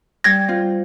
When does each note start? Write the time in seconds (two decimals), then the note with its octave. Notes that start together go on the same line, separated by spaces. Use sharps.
0.24 G3 G#6 A#6
0.48 C4 F4